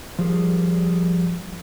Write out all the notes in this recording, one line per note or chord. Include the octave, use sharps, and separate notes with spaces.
F3 G3 G#4 A#4